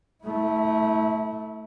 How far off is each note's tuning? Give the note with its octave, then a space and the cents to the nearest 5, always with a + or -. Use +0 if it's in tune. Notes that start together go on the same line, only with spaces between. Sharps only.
A3 +0 E4 -30